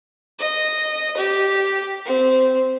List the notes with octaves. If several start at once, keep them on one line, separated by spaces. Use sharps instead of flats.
D#5
G4
C4